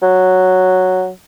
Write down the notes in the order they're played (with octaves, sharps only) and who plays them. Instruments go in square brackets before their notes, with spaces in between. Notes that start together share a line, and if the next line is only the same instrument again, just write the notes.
[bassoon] F#3